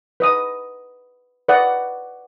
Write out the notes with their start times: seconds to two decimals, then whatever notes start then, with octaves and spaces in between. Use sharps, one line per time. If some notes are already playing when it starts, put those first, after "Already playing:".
0.20 B4 D#5 D#6
1.48 B4 D5 D#5 F#5